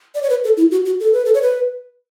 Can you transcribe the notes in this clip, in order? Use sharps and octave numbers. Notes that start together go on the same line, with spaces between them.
D5
C#5
B4
A4
E4
F#4
F#4
A4
B4
A4
C#5
B4